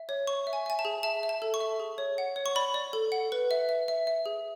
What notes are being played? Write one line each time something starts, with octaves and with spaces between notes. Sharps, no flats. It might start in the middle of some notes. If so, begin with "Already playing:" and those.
Already playing: E5
C#5
C#5 C#6
E5
G#5
E5 G#5
A5
G#4
E5 A5
E5
A5
A4
C#6
E5
G#4
C#5
F#5
C#5
C#6
D5 B5
D5
A4
F#5
B4
E5
E5
E5
E5
G#4